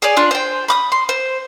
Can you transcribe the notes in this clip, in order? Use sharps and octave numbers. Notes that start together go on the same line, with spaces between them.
G#4 C#5 D5 G#5
D4 F4
C5 G5
B5 D6 D#6
C6
C5